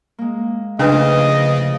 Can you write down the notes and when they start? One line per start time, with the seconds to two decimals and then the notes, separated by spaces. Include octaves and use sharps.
0.19 G#3 A#3
0.79 C#3 F3 A3 C#4 D4 E4 B4 D#5